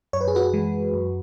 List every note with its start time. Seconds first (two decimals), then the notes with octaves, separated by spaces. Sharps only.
0.13 F#2 C#5
0.21 B4
0.28 G#4
0.35 F#4 B4
0.53 E3 G#3
0.93 F#2